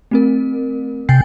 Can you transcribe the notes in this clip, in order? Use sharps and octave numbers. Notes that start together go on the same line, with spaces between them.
A3 C4 A#4
C3 G5 G#5 A6